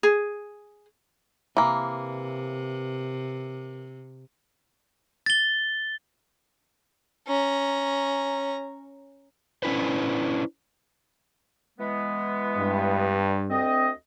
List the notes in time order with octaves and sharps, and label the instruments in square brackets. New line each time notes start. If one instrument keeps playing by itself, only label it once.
[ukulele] G#4
[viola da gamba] C3 [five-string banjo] E3 A#3
[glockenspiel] A6 G7
[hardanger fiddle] C#4 A#5
[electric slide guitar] C#4 D4 E4 B4 C5
[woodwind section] E3 G#3 B3
[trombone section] G2
[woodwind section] D2 C4 D#5